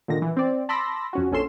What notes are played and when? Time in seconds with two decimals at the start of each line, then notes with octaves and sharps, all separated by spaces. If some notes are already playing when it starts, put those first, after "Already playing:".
0.08 A#2 D3 D#3 A#6
0.22 E3
0.37 C4 D5
0.69 A5 B5 C6 D6 E6 A#6
1.13 F2 C#4 F#4
1.32 A#1 C#4 A4 C6 E7